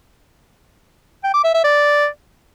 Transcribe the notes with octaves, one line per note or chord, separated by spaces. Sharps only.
G5
D6
E5
E5
D5